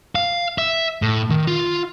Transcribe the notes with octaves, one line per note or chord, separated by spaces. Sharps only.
F5
E5
A2
D#3
F4